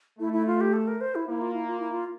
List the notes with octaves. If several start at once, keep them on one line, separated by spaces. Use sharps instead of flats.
A3 E4
E4
F4
G4
A4
A#4
C5
E4
A#3 E4
F4
E4
F4
E4
F4